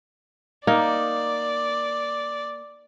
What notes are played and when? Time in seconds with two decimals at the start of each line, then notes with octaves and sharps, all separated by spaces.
0.67 A#3 D#4 D5